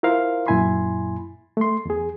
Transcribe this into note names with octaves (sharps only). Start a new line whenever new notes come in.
E4 F4 A#4 C5 F5
F#2 A#2 E4 G#5 B5 C6
A3 C6
E2 G#4